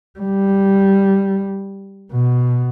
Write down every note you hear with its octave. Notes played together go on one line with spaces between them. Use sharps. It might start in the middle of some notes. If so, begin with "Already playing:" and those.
G3
B2